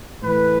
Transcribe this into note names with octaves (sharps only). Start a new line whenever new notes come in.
A2 E3 A3 B4